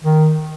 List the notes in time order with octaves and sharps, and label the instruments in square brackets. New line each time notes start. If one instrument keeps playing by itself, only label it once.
[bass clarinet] D#3